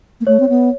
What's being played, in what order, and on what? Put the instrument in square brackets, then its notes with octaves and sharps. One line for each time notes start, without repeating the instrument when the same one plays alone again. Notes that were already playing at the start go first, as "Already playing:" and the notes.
[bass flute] A#3
[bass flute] A3 [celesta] C#5
[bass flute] C4
B3